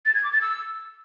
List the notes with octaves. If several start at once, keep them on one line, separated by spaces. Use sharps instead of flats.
A6
G#6
D6
A6
E6